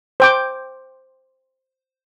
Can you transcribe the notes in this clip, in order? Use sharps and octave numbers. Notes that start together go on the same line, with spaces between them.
C5 G5 D6